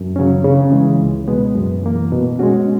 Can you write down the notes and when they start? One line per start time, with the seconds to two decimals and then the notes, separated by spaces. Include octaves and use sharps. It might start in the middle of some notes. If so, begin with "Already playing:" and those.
Already playing: F#2
0.16 C#3 F#3 C#4
0.44 C#3
0.72 E3 G#3
1.00 C#2
1.28 B2 G#3 B3
1.56 F#2
1.83 E3 A#3
2.12 B2
2.39 G#3 C#4 F#4